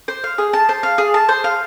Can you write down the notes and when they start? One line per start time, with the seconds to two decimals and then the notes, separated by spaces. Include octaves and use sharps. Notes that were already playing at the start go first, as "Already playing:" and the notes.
0.08 C5
0.24 F5
0.38 G#4
0.53 A5
0.69 C5
0.83 F5
0.98 G#4
1.14 A5
1.29 C5
1.44 F5